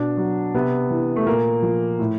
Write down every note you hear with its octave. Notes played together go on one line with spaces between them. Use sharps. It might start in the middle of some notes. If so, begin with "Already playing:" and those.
Already playing: B2 D4
F#3
C3 B3
E3
A3
A#2 A#3
F3
A2